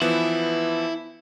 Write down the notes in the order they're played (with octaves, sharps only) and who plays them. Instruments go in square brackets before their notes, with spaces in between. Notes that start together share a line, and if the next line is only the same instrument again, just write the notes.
[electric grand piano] E3 F3 B3 [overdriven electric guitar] E4